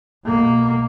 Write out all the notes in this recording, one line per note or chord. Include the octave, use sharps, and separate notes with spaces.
B2 A#3